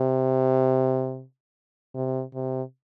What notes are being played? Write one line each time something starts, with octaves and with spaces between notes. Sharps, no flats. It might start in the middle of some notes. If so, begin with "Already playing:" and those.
Already playing: C3
C3
C3